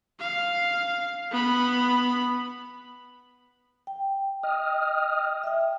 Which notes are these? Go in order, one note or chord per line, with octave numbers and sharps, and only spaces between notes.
F5
B3 B5
G5
D#5 D#6 F6
E5 G5